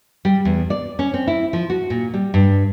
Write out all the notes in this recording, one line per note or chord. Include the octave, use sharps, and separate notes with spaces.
G3
E2
D5
C#4
C4
E4
F3
F#4
A#2
G3
G2